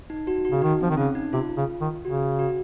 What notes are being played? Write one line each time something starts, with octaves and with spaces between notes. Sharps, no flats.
D#4
F#4
F#4
C#3
D#3 D#4
F3 C4
D#3
C#3 C#4
D#4
C3 F4
C#3
D#3
C#3 F#4
F#4